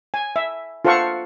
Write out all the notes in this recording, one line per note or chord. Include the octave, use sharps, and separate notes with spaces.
G#5
E5
F4 A4 C5 F5 F#5 C#6